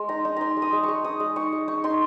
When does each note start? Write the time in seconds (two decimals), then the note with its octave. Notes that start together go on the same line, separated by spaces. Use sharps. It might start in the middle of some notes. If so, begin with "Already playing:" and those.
Already playing: G#3 C6
0.09 D#4 A#5
0.25 D#4
0.36 D#4 A#5 C6
0.57 G#3
0.62 D#6
0.73 G#3
0.83 G#3 C#6
1.04 D#4 D#6
1.20 G#3
1.36 D#4 C#6
1.52 G#3
1.68 D#4 C#6
1.84 D#4 C6